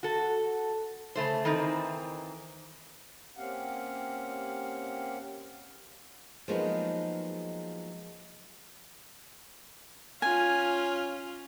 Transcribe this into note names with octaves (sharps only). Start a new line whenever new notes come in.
F#4 A4
C#3 A3 C5
D#3 E3 C4 D#4
A#3 C4 C#4 G4 F5 F#5
F3 F#3 G#3 A#3 B3 D#4
C#4 F4 G#5